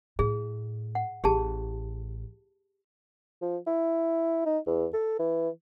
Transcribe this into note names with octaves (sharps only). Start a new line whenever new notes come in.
A2 G#4
F#5
A1 G4 G#4 A5
F3
E4
D#4
E2
A4
E3